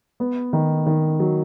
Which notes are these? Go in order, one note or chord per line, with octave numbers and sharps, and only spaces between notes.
B3
D#3
D#3
F#3